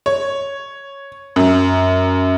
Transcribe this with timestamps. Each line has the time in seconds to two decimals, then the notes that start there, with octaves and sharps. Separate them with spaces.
0.06 C#5
1.36 F#2